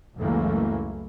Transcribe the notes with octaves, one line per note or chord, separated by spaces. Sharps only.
C#2 F#2 E3 A3 A#3 C#4